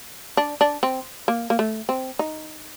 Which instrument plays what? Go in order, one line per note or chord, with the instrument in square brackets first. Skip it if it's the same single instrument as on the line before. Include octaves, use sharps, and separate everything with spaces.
[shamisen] D4
D4
C4
A#3
A#3
A3
C4
D#4